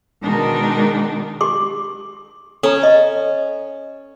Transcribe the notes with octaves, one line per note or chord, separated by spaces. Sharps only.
B2 D#3 G#3 D4 D#4 A#4
G4 C6 D6
C#4 A4 A#5
D#5